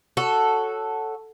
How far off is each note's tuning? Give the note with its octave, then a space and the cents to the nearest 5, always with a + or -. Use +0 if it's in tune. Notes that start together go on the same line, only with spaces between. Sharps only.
F#4 +0 A4 +0 C#5 +5